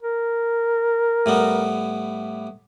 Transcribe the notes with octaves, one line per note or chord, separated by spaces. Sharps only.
A#4
A2 G3 B3